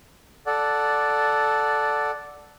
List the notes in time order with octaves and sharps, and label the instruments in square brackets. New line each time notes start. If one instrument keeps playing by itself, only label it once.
[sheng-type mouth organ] A4 D5 F#5